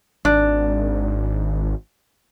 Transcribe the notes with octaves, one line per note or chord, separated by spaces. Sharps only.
G#1 D4